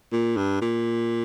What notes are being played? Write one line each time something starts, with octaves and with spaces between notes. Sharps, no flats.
A#2
G2
A#2